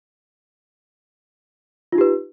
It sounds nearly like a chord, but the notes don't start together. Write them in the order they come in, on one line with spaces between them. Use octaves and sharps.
F4 D#4 G4 B4